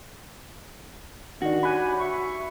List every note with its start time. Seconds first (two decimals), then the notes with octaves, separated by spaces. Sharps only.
1.42 D#3 D4 F#4
1.63 G4 C#5 G#5 B5 F#6
1.99 E5 C#6